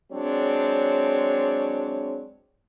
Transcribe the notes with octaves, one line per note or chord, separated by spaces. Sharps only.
F#3 G#3 C4 D4 C#5